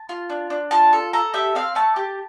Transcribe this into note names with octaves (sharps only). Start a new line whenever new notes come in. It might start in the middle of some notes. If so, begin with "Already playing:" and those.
Already playing: A5
F4
D4
D4
F4 A5
A4
A4 A#5
G4 E5
C4 F5
A3 A5
G4